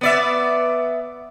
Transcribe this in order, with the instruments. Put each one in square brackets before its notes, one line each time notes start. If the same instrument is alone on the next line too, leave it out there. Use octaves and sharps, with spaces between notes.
[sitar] B3 D5 E5